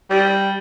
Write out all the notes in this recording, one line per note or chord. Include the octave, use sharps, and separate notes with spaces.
G3